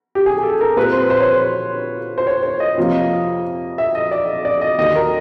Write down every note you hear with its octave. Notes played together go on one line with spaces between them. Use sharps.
G4
G#4
G#4
A4
A#4
A#2 G3 C4 B4
C5
C5
C#5
C5
C5
C#5
C#5
D#5
F2 C3 F3 A#3
E5
D#5
D5
D5
D#5
D#2 D#3 F#3 D#5
A#4